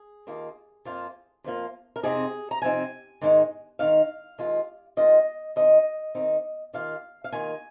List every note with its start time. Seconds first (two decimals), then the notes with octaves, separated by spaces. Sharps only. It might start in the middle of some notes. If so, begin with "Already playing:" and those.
Already playing: G#4
0.27 D#2 D#3 A#3 F4
0.85 F2 F3 A#3 F4
1.44 F2 F3 A#3 F4
1.96 A#4
2.03 F2 C3 F3 C4 D#4 G#4
2.51 A#5
2.62 F2 C3 F3 C4 D#4 G#5
3.21 G#2 D#3 G#3 D#4
3.79 G#2 D#3 G#3 D#4 F5
4.38 D#2 D#3 G#3 F4
4.97 D#2 D#3 G#3 F4 D#5
5.56 D#2 D#3 C4 D#4 D#5
6.15 D#2 D#3 C4 D#4
6.73 D#2 D#3 A#3 F4 F5
7.24 F5
7.32 D#2 D#3 A#3 F4 G#5